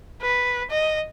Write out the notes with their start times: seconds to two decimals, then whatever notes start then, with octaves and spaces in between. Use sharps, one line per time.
0.21 B4
0.70 D#5